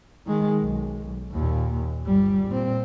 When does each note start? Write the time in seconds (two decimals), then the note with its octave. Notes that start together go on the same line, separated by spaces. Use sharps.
0.26 D#3 G#3
0.61 B1
1.32 D#2 A#2
2.05 G1 G3
2.49 A#2 C4